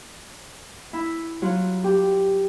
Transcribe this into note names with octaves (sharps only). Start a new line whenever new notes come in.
E4
F#3 F4 F#4
G4